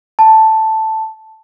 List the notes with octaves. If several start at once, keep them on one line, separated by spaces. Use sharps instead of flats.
A5